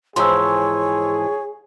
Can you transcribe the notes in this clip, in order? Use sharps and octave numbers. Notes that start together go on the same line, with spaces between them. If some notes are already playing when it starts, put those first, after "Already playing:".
G#2 E3 F3 G#4 C#5 C6 E6